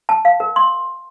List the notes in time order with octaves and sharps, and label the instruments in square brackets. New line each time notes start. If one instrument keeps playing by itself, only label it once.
[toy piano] A5
F5
A#4
C6